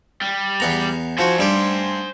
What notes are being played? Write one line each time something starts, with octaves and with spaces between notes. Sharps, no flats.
G3
E2 B3 A#5
F3 F#4 C5 G#5
G2 G3 G4